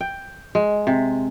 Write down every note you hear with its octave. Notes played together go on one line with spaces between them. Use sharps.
G5
G#3
C3